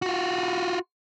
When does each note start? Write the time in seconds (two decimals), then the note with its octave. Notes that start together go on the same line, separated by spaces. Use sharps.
0.02 F4 F#4